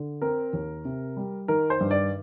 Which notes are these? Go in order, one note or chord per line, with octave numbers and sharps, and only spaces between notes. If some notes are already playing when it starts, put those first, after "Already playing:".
Already playing: D3
C4 A#4
D#2
C3
G3
D#3 A#4
C5
G2
D5